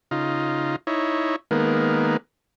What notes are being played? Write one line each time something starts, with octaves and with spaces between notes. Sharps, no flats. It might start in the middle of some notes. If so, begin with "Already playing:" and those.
C#3 D#4 F4
D#4 E4 C#5
D#3 G#3 A#3 B3